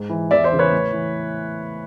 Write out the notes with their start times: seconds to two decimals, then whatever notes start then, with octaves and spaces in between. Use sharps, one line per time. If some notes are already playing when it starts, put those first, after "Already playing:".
Already playing: G#2
0.10 E3
0.31 E2 D5 E5
0.44 C5 D5
0.51 C#3 E3
0.59 B4 C#5
0.72 A2
0.93 E3